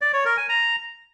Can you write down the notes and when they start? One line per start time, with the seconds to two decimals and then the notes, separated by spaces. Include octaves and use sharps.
0.01 D5
0.13 C#5
0.25 A#4
0.37 G#5
0.49 A#5